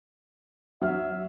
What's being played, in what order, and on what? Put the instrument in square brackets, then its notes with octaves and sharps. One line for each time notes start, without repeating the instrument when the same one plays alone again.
[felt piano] F#3 F6 [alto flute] E5